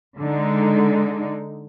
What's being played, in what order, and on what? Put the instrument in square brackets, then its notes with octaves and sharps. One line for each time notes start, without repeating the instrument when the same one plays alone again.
[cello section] D3 G#3 D#4